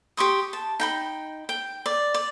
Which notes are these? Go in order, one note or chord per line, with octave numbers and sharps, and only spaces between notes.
G4 C6 C#6 D#6
A5
D#4 G5 B5
G5
D5
D5